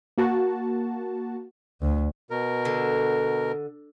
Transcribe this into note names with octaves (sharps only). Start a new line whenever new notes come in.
A#3 F#4 A5
D2
B2 A#4
D3